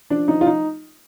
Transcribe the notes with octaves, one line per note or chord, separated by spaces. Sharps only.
F3 D4
F3 D#4
F4
D#4